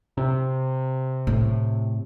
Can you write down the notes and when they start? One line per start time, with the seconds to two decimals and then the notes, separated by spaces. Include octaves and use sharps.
0.17 C3
1.27 A2